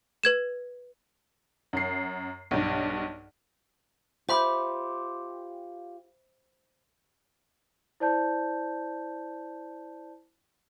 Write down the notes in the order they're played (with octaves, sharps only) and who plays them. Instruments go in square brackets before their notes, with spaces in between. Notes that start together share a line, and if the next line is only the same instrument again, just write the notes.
[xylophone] B4 G#6 E7
[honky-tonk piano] F#2 C7
B1 G2
[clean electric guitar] F4 G4 [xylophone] C5 E5 B5
[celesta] E4 C5 D5 A5 G6